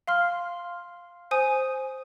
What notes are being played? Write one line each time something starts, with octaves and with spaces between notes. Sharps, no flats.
F5 C6 F6
C5 G#5 D#6